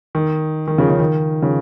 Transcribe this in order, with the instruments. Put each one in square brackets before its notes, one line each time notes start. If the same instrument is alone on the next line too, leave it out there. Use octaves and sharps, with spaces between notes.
[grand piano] D#3
D#3
C#3 F3
C#3
D#3
C#3 F3